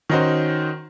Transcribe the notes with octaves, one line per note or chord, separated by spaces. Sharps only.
D#3 C#4 D#4 F#4 C5